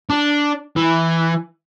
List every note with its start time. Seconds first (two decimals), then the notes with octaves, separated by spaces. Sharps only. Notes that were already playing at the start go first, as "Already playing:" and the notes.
0.10 D4
0.76 E3